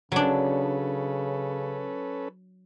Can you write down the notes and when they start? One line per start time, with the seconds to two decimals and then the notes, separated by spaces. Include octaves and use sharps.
0.12 C#3 F#3 C#4 D4 A4 B4